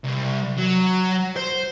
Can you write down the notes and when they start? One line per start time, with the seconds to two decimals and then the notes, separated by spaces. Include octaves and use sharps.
0.04 C2
0.58 F#3
1.36 C5